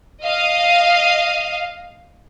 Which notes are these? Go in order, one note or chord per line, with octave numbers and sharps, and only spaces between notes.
D#5 F5